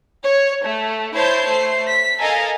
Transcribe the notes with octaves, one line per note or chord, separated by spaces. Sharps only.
C#5
A3
E4 C5 C#5 A5 G6 C7
A3 C5 C7
B6
A4 A#4 D#5 F5 G#5 A#5